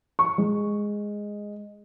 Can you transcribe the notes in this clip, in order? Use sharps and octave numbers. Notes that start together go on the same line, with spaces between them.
C#6
G#3